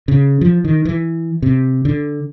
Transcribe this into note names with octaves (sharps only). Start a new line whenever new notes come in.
C#3
F3
D#3
E3
C3
D3